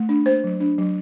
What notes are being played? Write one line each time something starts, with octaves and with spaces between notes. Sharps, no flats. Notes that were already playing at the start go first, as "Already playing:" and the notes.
Already playing: A3
D4
A#3 C5
F#3
D4
F#3